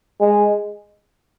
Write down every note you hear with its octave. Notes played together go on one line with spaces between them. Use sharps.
G#3